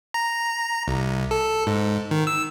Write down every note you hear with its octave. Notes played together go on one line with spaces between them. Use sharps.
A#5
C2
A4
G#2
D#3
E6